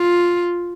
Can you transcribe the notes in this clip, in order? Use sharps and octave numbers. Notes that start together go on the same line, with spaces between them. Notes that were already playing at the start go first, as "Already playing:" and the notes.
Already playing: F4